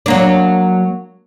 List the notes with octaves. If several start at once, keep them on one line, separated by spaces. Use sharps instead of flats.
F#3 A#3 D4